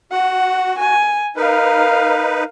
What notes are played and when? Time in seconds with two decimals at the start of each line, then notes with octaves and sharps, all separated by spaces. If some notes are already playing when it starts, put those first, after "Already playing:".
0.12 F#4 F#5
0.79 G#5
1.36 D#4 A#4 B4 F5